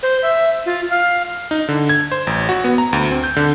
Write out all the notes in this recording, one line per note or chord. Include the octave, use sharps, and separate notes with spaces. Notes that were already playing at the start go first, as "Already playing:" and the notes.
C5
E5
F4
F5
D#4
D3
G#6
C5
A1
F#4
B3
A#5
D2
C4
G6
D3